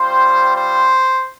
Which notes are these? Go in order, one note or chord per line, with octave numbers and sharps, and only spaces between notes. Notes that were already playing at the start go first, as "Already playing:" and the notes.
Already playing: G3 C4 F4 C5
C5